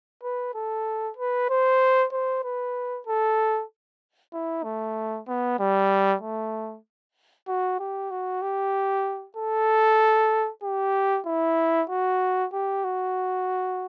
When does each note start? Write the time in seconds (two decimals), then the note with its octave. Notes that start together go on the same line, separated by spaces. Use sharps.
0.23 B4
0.54 A4
1.17 B4
1.49 C5
2.12 C5
2.44 B4
3.07 A4
4.33 E4
4.64 A3
5.28 B3
5.59 G3
6.21 A3
7.48 F#4
7.80 G4
8.11 F#4
8.42 G4
9.37 A4
10.63 G4
11.26 E4
11.90 F#4
12.53 G4
12.84 F#4